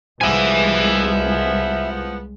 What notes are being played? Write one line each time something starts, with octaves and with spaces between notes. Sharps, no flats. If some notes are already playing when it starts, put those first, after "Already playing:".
C2 F3 G#3 B3 E5 G#5